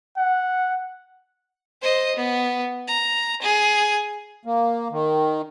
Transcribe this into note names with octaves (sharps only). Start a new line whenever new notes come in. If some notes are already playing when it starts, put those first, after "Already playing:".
F#5
C5 D#5
B3
A#5
G#4
A#3
D#3